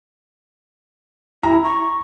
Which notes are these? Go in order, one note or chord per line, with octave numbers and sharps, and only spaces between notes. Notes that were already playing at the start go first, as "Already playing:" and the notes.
E4 A#5
C#6